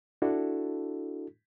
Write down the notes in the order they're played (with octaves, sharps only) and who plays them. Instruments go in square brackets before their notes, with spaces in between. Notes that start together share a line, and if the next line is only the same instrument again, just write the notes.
[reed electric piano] D4 E4 F#4 A4